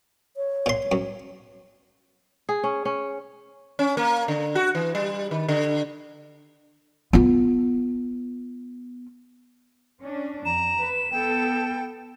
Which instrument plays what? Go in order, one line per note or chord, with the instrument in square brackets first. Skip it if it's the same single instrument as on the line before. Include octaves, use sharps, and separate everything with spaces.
[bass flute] C#5
[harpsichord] A#2 C6
F#2
[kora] G#4
C#4
C#4
[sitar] C#4
A#3
D3
F#4
E3
G3
D#3
D3
[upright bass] B3 F4
[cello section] C#4 D4
[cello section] F2 [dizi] A#5 [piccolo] E7
[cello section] B4
[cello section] B3 A4 [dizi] G5